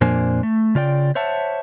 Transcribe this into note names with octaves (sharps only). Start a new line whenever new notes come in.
F2 A#2 A#3 D4 C5 G#5
A3
C#3 F4 D5 G5
C5 C#5 E5 F#5 A5